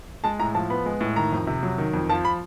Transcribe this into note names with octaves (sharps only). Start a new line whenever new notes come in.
G#3 A5
A2 A#5
F3 A5
B3 B5
G#3
A2
D#3 A#5
F2
C3
F#3
D#3
F2
F3 A5
B5